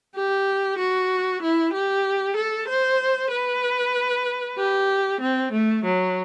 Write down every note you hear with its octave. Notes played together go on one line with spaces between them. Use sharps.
G4
F#4
E4
G4
A4
C5
B4
G4
C4
A3
F#3